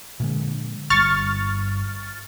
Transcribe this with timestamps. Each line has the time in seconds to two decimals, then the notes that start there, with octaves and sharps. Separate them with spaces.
0.20 A#2 D3 G#3
0.90 G1 G2 C#6 F6 A6